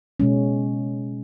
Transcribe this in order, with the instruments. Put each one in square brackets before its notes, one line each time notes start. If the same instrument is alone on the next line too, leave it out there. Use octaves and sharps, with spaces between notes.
[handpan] B2 G#3 C#4